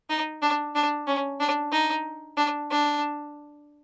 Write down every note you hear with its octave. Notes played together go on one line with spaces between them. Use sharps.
D#4
D4
D4
C#4
D4
D#4
D4
D4